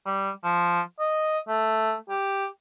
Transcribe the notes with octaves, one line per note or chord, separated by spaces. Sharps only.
G3
F3
D#5
A3
G4